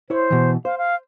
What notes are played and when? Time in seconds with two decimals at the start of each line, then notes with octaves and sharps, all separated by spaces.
0.10 E4 C5 C#5
0.30 B2 E3
0.65 C5 F5
0.78 F5